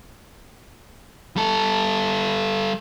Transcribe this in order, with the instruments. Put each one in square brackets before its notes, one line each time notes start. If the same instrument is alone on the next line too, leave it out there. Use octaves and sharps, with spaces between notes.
[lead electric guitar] G3 A4